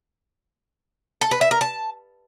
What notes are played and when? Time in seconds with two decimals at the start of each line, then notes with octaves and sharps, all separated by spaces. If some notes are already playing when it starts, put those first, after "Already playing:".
1.21 A4
1.31 B4
1.41 E5
1.51 A#4
1.61 A5